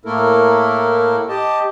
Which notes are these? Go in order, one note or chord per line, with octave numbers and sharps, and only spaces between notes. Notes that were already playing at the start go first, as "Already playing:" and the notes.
A2 A3 A#3 E4 A4 A#4
G4 D#5 A5